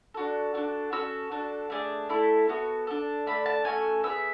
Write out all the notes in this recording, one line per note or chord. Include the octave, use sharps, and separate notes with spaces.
D4 F#4 A4
D4 F#4 A4
C#4 F#4 A4 E6
D4 F#4 A4
A3 D4 G#4
A3 E4 A4
B3 F#4 A4
D4 A4
A3 D4 A4 B5
A5
A3 C#4 F#4 A4 G#5
B3 D4 G#4 E5